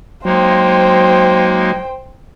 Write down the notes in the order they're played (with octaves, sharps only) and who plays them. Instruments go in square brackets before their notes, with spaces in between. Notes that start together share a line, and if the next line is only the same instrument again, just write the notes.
[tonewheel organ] F#3 [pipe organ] G#3 A#3 D#4 [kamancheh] C5 G5